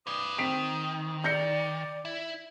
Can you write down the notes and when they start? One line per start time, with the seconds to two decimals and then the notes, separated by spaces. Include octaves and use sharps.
0.07 B4 D5 D#6
0.38 D#3 C4 B6 D7
1.24 D5 G6 A#6 C#7
2.05 E4